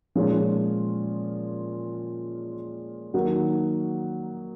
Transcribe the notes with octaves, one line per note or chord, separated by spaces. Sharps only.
A#2 F3 G#3 C#4 F4
D#3 F#3 A#3 D#4 F#4